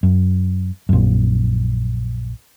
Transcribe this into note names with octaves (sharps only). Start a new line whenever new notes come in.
F#2
A#1 F#2